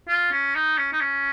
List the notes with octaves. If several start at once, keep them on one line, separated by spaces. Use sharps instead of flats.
F4
C#4
D#4
C#4
D#4
C#4